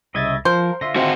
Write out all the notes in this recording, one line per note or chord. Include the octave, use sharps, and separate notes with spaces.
C2 C#3 D#5 E5 G#6 A6
F3 F4 A#4 C5
D3 F4 E5 C6 A#6
C4 F#4